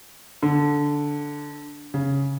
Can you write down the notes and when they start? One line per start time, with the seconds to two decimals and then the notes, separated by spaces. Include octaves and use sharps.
0.43 D3
1.94 C#3